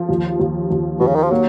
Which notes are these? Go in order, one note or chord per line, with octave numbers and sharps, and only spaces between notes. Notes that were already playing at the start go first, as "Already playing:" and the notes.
Already playing: F3
D#2
D#2
D#2
D#2 B2
C#3
D#3
F3
F#3 A#3